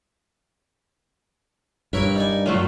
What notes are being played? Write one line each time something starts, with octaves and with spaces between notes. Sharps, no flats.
G2 E4 A#4 B4 C#5
D#4 D5 G#5
F#2 A2 F#3 A3 F4